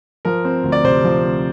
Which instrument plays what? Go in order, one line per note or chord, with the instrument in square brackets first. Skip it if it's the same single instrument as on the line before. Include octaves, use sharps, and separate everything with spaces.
[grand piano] F3 A#4
C4
D2
D5
C3 C5
F3
C4